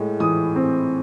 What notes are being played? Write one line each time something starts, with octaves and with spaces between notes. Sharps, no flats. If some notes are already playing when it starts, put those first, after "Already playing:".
Already playing: A2 G#3
E3 D#6
C4